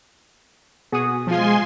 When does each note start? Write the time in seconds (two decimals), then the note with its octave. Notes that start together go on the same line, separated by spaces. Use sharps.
0.92 B2 F#4 G#4 D#6
1.27 F3 G#3 F4 G#5 C6